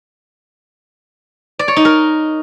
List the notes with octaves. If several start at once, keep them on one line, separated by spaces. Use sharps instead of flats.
D5
C#5
D#4
A#4